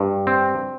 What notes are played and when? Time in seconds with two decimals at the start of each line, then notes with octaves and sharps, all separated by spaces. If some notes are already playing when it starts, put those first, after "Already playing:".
Already playing: G2
0.27 C4